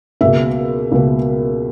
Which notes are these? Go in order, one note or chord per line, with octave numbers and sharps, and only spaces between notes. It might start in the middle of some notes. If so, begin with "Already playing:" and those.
C#2 B2 A#3 E5
C#2 B2 A#3